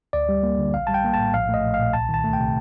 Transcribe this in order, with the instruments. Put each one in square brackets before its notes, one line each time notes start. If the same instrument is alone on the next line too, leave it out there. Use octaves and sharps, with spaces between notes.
[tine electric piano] D2 D5
G3
A#3
D3
A#1 F5
G3 A5
G5
A#3
A2 A5
A#1 F5
A3 D#5
A#1
A#2 F5
C2 A5
D#3
A5
A3
G5
C3